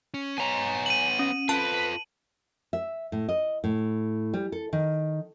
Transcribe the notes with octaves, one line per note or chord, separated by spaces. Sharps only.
C#4
B3 C#5 G#5 A#5
D#7 F#7
C#4
F4 A4 B4 A5
E5
A2
D#5
A2
G3
A4
D#3